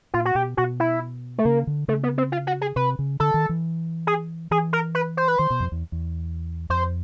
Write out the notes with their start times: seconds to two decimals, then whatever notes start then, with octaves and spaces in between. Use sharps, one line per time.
0.14 A#2 F4
0.25 F#4
0.35 B2 G4
0.57 B2 F#4
0.80 E4
1.38 A3
1.45 C#3 A#3
1.67 D3
1.88 C#3 A3
2.03 B3
2.18 C4
2.32 F4
2.47 F#4
2.61 G#4
2.76 C3 B4
2.99 C#3
3.20 D3 A4
3.34 D#3
3.49 E3
4.07 G#4
4.51 E3 G#4
4.73 A#4
4.95 B4
5.17 C5
5.28 B4
5.39 D#3 C5
5.50 B2
5.60 F2
5.72 E2
5.92 E2
6.70 F2 C5